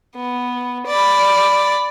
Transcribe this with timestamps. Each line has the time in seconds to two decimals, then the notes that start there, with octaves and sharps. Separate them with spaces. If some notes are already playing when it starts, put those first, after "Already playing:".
0.16 B3
0.87 D5 B5